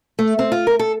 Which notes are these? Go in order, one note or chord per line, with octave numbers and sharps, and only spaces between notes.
A3
C4
F4
A#4
A4